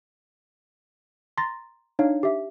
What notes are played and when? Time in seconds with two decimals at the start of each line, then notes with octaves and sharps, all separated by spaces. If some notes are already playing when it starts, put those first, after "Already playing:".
1.38 A#5 C6 A6 A#6
1.99 D4 D#4 C#5 F5
2.23 G4 E5